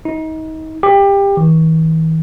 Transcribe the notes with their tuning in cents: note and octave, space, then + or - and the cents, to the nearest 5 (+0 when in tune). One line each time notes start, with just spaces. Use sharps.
D#4 +30
G4 +20
E3 -45